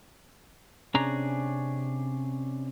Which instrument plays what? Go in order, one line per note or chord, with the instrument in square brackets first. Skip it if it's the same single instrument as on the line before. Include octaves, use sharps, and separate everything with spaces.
[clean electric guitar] C3 C#4 D4 G#4 A#5